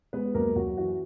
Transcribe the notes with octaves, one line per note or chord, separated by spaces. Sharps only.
G#3 B3 B4
F#2 A#3 A#4
F#2 F#4
E3 F#4